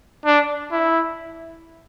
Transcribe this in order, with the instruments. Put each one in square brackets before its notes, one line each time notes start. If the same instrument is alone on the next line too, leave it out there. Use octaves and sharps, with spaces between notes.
[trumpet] D4
E4